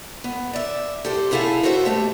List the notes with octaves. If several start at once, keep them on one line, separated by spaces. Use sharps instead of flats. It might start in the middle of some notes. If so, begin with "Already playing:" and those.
B3
D5 E5
G4 A4 C5
E2 A2 E4 G#4 A4 F5
F#4 A4 B4 C5 D#5 E5
B2 A3 G4